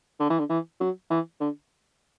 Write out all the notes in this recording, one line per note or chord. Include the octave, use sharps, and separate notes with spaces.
D3
E3
D3
E3
F#3
E3
D3